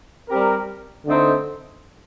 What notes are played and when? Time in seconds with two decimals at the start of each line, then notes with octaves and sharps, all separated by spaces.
0.28 G3 C4 G4 A#4
1.06 D3 A3 C4 D#4